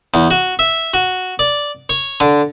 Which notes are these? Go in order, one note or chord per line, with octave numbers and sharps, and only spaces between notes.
E2
F#4
E5
F#4
D5
C#5
D3